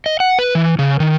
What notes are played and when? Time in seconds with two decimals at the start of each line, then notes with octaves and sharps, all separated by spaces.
0.06 D#5
0.20 F#5
0.39 B4
0.55 E3
0.79 C#3
1.00 D#3